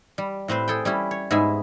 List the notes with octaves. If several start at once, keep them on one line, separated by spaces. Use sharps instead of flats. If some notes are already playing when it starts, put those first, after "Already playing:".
G3
A2 C4 B4 C5
G#4 A4 G5
G3 C#4 E4
C#5
G#2 B3 E4 G#4 E5 G#5